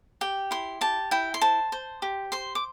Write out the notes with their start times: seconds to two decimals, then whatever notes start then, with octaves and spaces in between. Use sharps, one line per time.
0.21 G4 G5
0.51 E4 C6
0.81 G4 A5
1.11 E4 G5
1.34 C6
1.41 C5 A5
1.72 C5
2.02 G4
2.32 C5 C6
2.55 D6